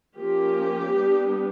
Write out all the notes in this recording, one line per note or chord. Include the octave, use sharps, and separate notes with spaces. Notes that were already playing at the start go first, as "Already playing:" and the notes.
F3 A#3 C#4 G4
G3 B3 D4